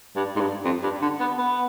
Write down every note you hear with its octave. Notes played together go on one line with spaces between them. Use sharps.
G2
G#2
G2
F2
G2
D3
B3
B3